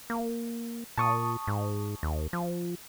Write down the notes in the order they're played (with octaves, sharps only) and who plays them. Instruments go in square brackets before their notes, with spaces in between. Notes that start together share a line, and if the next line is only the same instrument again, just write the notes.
[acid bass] A#3
[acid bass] A#2 [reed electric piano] A5 C#6 D#6
[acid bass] G#2
D#2
F3